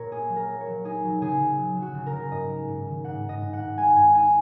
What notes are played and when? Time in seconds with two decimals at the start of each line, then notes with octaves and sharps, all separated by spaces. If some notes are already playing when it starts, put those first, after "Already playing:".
Already playing: A#2 A#4 C#5
0.11 A#3 G#4
0.29 F#3
0.36 A#4
0.48 A#3
0.61 C#5
0.67 F#3
0.85 D#4 G#4
1.04 F#3
1.21 C#3 G#4
1.40 C#3
1.58 F#3
1.76 F#3
1.82 F#4
1.94 C#3
2.06 A#4
2.13 C#3
2.31 G#2 D#5
2.49 G#3
2.68 G#2
2.87 D#3
3.04 G#2 F#5
3.23 G#2
3.29 D#5
3.42 G#2
3.53 F#5
3.59 G#2
3.78 G#3 G#5
3.96 G#2 G#5
4.15 D#4 G#5